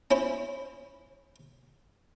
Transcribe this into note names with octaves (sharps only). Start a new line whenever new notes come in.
C#4 E4 C5